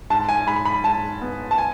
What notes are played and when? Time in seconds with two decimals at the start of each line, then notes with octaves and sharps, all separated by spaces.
0.10 G#2 A5
0.29 G#5
0.47 G#2 B5
0.65 B5
0.84 G#2 A5
1.22 B3
1.51 A5
1.58 G#5